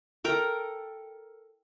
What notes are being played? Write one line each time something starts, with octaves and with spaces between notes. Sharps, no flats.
A4 A#4 G5 A#5